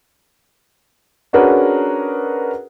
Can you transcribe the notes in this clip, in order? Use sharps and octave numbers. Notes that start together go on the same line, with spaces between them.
C#4 D4 F#4 G#4 A#4 B4